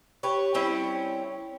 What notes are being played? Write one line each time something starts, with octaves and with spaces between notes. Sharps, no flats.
G4 B4 C#5
G3 C4 C#4 E4